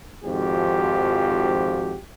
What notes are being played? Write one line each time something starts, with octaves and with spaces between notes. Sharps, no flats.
G#1 F2 G#2 F3 F#4 G4